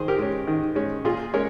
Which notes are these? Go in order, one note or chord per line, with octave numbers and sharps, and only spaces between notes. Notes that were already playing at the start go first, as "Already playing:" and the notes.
Already playing: D#3 G#4 C5
G4 A#4
G#3 C#4
D#3
G#3 C#4
A#2 F4 G#4
G#3 C#4 A#4 C#5